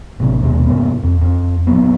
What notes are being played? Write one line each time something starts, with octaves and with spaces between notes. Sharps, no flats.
A1 C3
F1 D#2 B2 G#3
G2 C3 A#3 B3
F2
F2
F3 F#3 B3